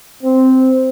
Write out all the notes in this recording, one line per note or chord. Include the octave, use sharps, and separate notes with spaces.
C4